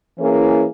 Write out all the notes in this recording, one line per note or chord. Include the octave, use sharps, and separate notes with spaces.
E3 A#3 C#4 E4 G#4